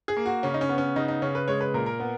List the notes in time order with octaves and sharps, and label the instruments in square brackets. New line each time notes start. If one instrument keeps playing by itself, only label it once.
[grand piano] G#4
A#3
F#4
C#3 C#4
D#4
C#4
B3
C#4
C#3 D#4
D#4
C#3 C#4
B4
G#3 C#5
B4
A#2 A#4
A#4
B3